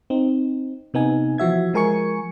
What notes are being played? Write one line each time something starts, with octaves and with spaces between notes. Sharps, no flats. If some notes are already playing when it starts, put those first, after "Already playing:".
C4 D#4
C3 B3 D#4 G#5
E3 F3 F#4 E5 G#6
F3 G#3 A#4 G#5 C#6 C#7